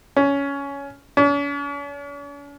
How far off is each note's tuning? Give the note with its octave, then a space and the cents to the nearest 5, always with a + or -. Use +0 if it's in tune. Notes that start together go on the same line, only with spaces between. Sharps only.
C#4 +15
C#4 +45